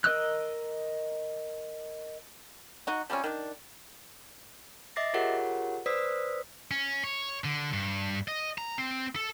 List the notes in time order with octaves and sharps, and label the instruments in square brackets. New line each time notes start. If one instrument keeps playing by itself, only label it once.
[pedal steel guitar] A#4 D#5 D#6 E6 F#6
[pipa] D#4 F#4
F3 G3 C4 C#4
D#3 D4
[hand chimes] D#5 E5 D6 A6 A#6 C7
F4 G4 G#4 A#4 C#5 F#5
B4 C5 D5 D#6 E6 B6
[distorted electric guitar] C#4
C#5
D3
G2
D#5
A#5
C4
A4